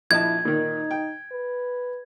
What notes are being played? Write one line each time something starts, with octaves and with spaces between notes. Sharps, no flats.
A#1 E4 D#5 A5 G#6
A#2 D#3 D#4
G5
B4